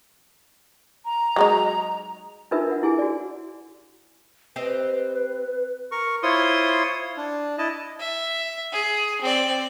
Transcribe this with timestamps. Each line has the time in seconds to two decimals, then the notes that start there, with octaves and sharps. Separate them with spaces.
1.05 A#5
1.36 F#3 G#3 D#4
2.51 D4 D#4 F4 A#4 B4 E5
2.67 D4 F#5
2.83 E4 G#4 G#5
2.99 F#4 D5
4.56 C4 G4 B4 D#5
5.92 A#4 C#6
6.23 E4 F4 C5 C#5 C6 D#6
7.17 D4
7.58 E4 D#5 A5
7.99 E5
8.72 G#4
9.21 C4 D5